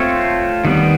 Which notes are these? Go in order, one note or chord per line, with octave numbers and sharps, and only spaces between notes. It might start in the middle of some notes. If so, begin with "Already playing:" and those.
Already playing: A3 C4 F4 A4 C#5
D#3 G3 B3